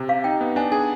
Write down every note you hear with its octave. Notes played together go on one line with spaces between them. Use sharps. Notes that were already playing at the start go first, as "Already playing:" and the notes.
Already playing: C3
G4 F5
D#4 G5
B3
D4 G#5
G#4 G#5